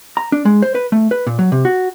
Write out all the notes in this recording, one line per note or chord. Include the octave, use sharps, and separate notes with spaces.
A#5
D4
G#3
C5
B4
A3
B4
A#2
F#3
C3
F#4